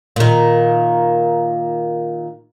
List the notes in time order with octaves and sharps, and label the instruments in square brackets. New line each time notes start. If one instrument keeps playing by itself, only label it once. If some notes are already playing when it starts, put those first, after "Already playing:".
[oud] A#2 D#3